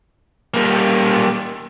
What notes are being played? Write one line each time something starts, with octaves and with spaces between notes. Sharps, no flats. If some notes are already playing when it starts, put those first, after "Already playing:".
G3 A#3